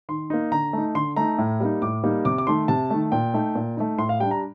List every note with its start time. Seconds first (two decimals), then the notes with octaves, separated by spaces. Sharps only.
0.09 D#3 C6
0.30 A#3 D#4
0.52 D3 A#5
0.73 A3 D#4
0.95 D3 C6
1.16 A3 D#4 A#5
1.38 A2
1.60 G3 A#3 D#4
1.82 A2 D6
2.04 G3 A#3 D#4
2.25 C3 D6
2.38 D6
2.47 D#3 A3 C6
2.68 C3 A5
2.90 D#3 A3
3.12 A#2 G5
3.34 A3 D#4
3.55 A#2
3.77 A3 D#4
3.98 A2 C6
4.09 F5
4.20 G3 D4 G5
4.31 A#5